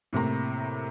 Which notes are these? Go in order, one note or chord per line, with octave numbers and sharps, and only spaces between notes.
A2 C3 A#3 A#5